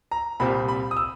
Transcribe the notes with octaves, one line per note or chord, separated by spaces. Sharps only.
A#5
C2 A#2 G3 C4 B5
B5
D#6
E6